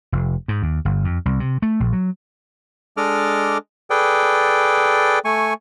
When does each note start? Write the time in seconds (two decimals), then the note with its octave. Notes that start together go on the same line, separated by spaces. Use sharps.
0.12 F1
0.48 G#2
0.62 D#2
0.85 G1
1.04 F2
1.25 C2
1.40 C3
1.62 A3
1.80 A#1
1.93 F#3
2.97 G#3 D4 A4 D#5 D6 F6
3.90 G#4 A4 B4 D5 G5
5.25 A3 G#5 C#6